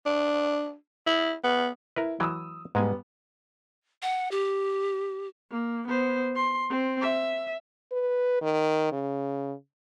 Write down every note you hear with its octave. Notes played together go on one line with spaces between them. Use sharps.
D4
E4
B3
E4 A#4 B4
E3 F#3 G5 D#6 E6
G#2 G3 G#3 B3 G#5
F#5
G4
A#3
B3 C5
C6
C4
E5
B4
D#3
C#3